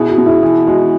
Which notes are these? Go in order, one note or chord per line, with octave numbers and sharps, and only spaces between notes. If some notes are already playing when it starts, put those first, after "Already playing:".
Already playing: B2 E4 G#4
F#4
B2
E4 G#4
E3 E4
G#3 F#4